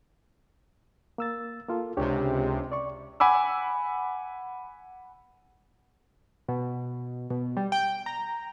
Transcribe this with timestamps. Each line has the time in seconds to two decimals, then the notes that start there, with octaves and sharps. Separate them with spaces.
1.18 A#3 E6 A6
1.69 A#3 F4 A4
1.97 C#2 C3 D4 G4 C#5
2.72 D5 C#6
3.20 F#5 G#5 B5 D6 E6
6.48 B2
7.30 B2
7.57 G3
7.72 G5
8.06 A#5